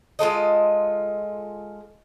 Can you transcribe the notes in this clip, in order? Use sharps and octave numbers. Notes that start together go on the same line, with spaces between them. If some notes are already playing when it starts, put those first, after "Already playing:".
G#3 F4 A4 D#5